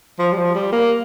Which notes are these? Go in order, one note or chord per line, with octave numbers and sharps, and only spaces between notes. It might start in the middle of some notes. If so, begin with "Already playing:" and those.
F3
G3
F3
G3
A#3